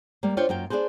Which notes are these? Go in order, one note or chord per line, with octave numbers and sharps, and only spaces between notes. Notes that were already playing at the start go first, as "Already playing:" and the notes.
G3 A#3
D4 F4 C5 C#5 G5
F#2 A#3 F4 G5
D4 D#4 G#4 B4 C5